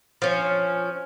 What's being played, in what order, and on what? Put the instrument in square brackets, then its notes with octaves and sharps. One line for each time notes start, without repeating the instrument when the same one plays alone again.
[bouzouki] F3 C#4